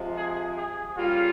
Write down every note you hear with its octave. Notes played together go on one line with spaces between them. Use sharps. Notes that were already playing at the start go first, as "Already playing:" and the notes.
Already playing: C3 F3 G#3
G#4
G#4
C#3 G3 A#3 F4